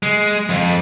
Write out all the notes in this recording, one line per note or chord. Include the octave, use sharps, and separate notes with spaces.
G#3
F2